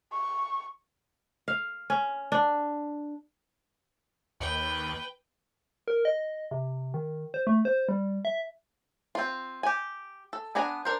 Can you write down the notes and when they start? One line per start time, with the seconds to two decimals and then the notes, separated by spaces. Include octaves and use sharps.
0.12 C#6
1.48 F5
1.90 C#4
2.32 D4
4.40 D#2 B4 G5
5.88 A#4
6.05 D#5
6.51 C3
6.94 D#3
7.34 C5
7.47 A3
7.65 C5
7.89 G3
8.25 E5
9.15 C4 F4
9.63 G4 G#5
10.33 A4
10.55 B3 D4 G#5 A#5
10.85 D4 A#4 C5